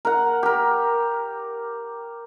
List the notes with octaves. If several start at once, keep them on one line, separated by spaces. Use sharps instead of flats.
A#4 F#5
G4 A#4